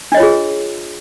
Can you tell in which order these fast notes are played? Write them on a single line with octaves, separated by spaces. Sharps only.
D4 D#5 C#5 F4 G#4